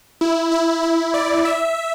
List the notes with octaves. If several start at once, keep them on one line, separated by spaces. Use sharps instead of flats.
E4
E4
E4
D5
E5